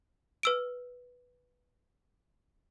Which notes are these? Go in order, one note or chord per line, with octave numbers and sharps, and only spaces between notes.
B4 E6 D7